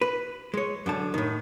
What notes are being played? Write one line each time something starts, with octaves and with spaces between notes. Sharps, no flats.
B4
G#3 C#5
F#2 D3 A5
A2 D#3